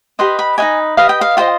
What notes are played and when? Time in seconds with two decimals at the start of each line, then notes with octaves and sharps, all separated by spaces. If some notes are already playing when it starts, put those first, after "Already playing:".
0.19 G4 B4 D#5 C6
0.39 B5
0.58 D#4 B4 D#5 G#5
0.97 G4 B4 D#5 F5
1.09 G5
1.21 F5
1.37 F4 C5 D#5 G5